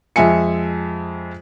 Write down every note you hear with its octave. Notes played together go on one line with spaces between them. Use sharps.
F2 G#3 E5 G#5 C#7